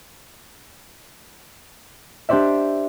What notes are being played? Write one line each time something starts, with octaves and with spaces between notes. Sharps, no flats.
D4 G4 C5 D5 E5